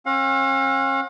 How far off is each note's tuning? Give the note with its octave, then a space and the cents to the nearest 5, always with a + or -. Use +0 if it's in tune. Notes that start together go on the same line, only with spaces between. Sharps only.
C#4 -45 F5 +45